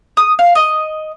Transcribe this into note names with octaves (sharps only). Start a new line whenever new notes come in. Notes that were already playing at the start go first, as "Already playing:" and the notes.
D#6
F5
D#5